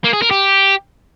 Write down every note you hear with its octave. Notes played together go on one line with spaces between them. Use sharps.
A#3
G#4
A#4
G4